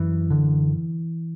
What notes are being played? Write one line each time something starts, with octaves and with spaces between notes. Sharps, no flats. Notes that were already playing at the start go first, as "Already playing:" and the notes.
Already playing: F#2 E3
D3